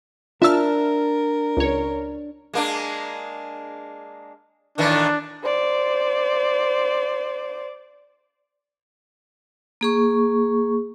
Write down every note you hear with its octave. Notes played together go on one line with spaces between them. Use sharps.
D4 F4 A#4 E5 A5 E6 F6
C#2 C#5
G#3 A#3 D4
A2 D#3 E3 D4
C5 D5
A#3 G#4 C#6